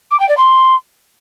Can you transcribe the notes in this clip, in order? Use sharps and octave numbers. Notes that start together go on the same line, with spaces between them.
D6
G5
D5
C6